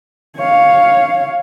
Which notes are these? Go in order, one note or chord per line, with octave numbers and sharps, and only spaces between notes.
C#5 F5